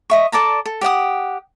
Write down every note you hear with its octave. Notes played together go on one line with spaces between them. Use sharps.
D#5 E5 C#6
A4 D5 A5 A#5
A4
G4 D5 F#5 D#6